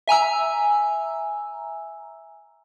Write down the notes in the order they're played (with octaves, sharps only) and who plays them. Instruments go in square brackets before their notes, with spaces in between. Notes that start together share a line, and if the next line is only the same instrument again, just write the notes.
[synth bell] E5 G#5 A#5 E6